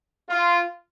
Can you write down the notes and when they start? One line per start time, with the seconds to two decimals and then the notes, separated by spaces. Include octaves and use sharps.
0.30 F4